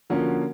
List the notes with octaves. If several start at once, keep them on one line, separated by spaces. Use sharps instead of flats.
D3 F3 A#3 C#4 F#4